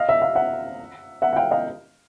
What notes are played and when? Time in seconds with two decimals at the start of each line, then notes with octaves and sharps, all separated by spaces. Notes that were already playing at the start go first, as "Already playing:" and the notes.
Already playing: D#5 F5
0.09 E5
0.22 F5
0.35 E5 F#5
1.22 E5 F#5
1.33 F#5
1.36 F5 G5
1.51 D#5 F5